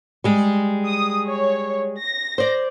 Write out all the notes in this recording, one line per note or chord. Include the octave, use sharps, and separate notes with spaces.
G3 G#3 G#4
D#6
C#5
A#6
C5 D5